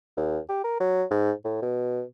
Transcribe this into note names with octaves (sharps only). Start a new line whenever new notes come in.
D#2
G4
A#4
F#3
G#2
A2
B2